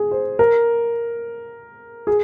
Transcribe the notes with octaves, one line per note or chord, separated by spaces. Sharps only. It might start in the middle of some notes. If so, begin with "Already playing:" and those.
Already playing: G#4
C5
A#4
G#4